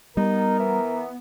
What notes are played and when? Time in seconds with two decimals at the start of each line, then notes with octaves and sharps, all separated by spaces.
0.17 G3 B3 D#4 A#4 A#5
0.59 E3